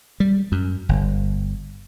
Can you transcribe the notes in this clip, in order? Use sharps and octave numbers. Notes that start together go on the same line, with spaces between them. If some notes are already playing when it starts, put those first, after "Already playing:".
G3
F#2
G1